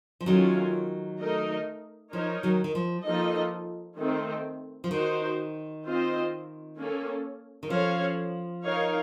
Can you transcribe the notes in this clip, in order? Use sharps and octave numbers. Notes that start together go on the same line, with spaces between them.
F3
D#3 F#3 A3 C#4 F4
A3 D#4 A#4 D#5
F3 D#4 A#4 C#5
D#3 F#3
D#3
F3
F3 A#3 D#4 A4 D#5
D#3 A3 C4
F3
D#3 D#4 F#4 C5
C4 F4 C5 D#5
A#3 C#4 A4
D#3
F3 C#4 A4 C#5 F5
D#4 A#4 C#5 F5